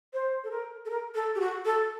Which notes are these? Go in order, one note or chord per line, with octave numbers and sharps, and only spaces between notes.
C5
A4
A#4
A4
A#4
A4
G4
F#4
A4